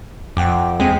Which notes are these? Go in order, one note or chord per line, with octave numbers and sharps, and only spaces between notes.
F2 F#5 G5 D6
E2 G#3 C4 G5